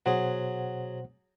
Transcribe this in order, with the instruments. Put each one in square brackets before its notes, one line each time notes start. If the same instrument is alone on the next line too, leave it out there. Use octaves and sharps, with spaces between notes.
[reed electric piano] B2 C5 F#5 [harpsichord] F#3 G#4